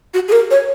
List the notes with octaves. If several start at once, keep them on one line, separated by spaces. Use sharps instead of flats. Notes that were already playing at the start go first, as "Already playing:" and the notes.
F#4
G#4
A#4
C#5